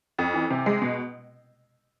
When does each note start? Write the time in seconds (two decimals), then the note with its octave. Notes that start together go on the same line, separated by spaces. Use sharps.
0.18 F2
0.34 E3
0.50 C3
0.66 G#3
0.81 B2